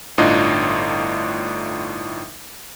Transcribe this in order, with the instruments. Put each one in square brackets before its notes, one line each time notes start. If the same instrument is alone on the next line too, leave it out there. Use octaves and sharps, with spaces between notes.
[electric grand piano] G1 A2 D4 D#4 F4 D#5